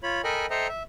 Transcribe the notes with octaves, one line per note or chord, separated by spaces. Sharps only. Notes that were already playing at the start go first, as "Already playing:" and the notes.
F4 C#5 B5
A4 A#4 D#5 G5 G#5 B5
A4 C5 D#5 E5 G5 A#5
E5